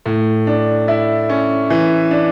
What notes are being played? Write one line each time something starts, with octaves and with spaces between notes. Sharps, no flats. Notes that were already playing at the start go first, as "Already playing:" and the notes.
A2
D4
E4
C#4
E3
D4